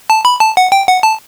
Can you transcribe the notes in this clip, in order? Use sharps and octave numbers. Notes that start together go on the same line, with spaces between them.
A5
B5
A5
F#5
G5
F#5
A5